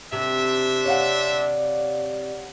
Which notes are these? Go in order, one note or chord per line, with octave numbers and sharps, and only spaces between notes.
C3 D4 C5 E5
C#5 D5 F5 F#5